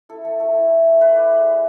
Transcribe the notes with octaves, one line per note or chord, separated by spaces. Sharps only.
E4 A4
A3 A4
A3 A4
E4
E4
A3
A3 B4
E4 D5
G#3 B4
G#3